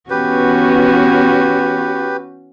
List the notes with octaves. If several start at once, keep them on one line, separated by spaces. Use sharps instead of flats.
E3 B3 C#4 F#4 G4 B4